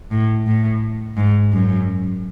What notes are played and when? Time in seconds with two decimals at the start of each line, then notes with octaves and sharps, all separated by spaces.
0.12 A2
0.46 A2
1.17 G#2
1.52 F#2